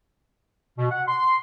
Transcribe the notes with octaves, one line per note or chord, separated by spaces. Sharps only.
B2
F#5
C6